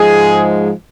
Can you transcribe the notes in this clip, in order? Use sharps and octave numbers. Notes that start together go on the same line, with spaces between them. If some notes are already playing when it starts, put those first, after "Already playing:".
Already playing: G#2 F3 G#3 G#4